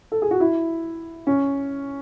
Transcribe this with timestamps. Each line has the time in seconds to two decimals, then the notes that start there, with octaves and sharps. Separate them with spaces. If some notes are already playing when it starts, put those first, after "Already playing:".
0.12 A4
0.22 G#4
0.31 F#4
0.40 E4
1.27 C#4